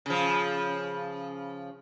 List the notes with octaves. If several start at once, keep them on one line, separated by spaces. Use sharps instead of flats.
C#3 F3